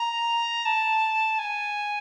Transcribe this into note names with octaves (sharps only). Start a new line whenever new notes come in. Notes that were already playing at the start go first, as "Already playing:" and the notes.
Already playing: A#5
A5
G#5